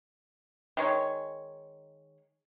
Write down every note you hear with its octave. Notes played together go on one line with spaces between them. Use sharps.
D#3 G#3 C#5